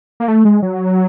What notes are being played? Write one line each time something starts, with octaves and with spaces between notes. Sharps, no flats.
A#3
A3
G#3
F#3